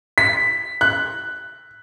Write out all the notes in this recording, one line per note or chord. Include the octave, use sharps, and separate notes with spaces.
B6
F#6